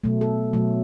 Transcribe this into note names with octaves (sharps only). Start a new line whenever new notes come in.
B2 F#3 A3
A4
B2 F#3 A3